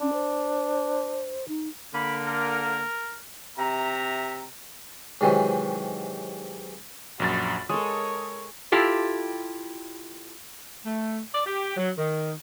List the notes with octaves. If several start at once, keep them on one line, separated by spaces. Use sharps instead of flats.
C#4 D4
C5
D#4
D3 A#3 B5
A#4
C3 E5 A#5
G#2 C3 D#3 E3 F#3
A#1 F#2 F#4 B5 A6
G#3 A4 A#4 C#5 D#6
E4 F4 G4 A4
A3
D5
G4
F#3
D#3